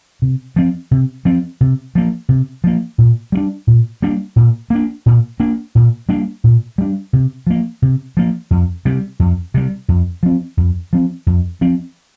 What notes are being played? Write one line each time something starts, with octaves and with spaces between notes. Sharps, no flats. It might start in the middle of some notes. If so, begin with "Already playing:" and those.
C3
F3 C4
C3
F3 C4
C3
F3 A#3
C3
F3 A#3
A#2
G3 A#3 D4
A#2
G3 A#3 D4
A#2
A#3 D4
A#2
A#3 D4
A#2
G3 A#3 D4
A#2
G3 A#3 D4
C3
F3 A#3
C3
F3 A#3
F2
C3 G3
F2
C3 G3
F2
F3 C4
F2
F3 C4
F2
F3 C4